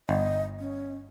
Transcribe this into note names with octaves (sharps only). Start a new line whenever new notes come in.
G1 D#5
C#4